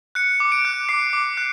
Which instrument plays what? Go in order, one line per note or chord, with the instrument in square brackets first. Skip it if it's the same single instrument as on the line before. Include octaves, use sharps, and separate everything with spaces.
[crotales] F#6 C#7
D6
D7
F#6
D6 C7
D6
F#6